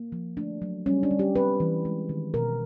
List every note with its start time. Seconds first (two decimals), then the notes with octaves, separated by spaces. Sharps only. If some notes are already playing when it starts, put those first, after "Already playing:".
Already playing: A#3
0.12 F3
0.37 A3 D4
0.62 F#3
0.86 G3 C#4
1.03 D4
1.11 G3
1.19 G4
1.36 C4 B4
1.60 E3
1.85 G#3
2.09 D#3
2.34 B2 A#4